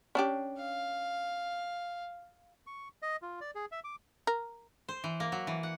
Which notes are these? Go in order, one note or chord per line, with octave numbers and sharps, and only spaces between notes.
C#4 D4 G4
F5
C#6
D#5
F4
D5
G#4
E5
D6
A#4
C5
E3
A#3
F#3
E3
F#5